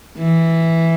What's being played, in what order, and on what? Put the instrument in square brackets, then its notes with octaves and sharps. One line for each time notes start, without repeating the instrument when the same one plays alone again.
[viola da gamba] E3